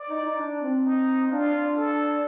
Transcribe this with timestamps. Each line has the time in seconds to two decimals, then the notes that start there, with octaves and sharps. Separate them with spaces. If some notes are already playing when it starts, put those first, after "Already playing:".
Already playing: D5
0.10 D#4
0.24 D#4
0.40 D4
0.62 C4
0.85 D#4
1.31 D4 F4
1.53 D4
1.76 A4